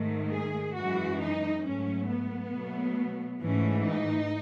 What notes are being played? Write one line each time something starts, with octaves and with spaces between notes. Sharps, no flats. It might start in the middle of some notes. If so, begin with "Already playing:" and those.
Already playing: G#2 D#3 A3
G#4
F#2 E3 G#3 F#4
D#4
G#2 F#3 A3 C#4
B3
B2 F#3 A3
G#2 E3 A3 C#4
D#4